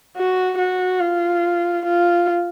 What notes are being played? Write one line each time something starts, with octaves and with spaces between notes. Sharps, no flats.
F#4
F#4
F4
F4